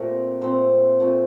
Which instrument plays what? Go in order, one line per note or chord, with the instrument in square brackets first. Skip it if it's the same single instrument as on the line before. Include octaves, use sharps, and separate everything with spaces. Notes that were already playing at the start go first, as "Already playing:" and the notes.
Already playing: [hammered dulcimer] A#2 A3 C4 G4 A#4
A#2 A3 C4 C5
A#2 A3 C4